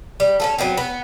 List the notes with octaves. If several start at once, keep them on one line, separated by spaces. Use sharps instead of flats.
G3
C#4 F4 A4
F#3 G#3 B3 C4
B3